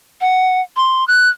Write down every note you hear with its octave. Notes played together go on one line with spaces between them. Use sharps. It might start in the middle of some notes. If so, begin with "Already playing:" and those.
F#5
C6
F#6